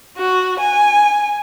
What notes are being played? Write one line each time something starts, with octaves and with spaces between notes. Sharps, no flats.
F#4
G#5